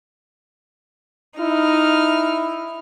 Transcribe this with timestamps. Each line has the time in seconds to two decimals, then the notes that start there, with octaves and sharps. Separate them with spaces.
1.40 D#4 E4 F6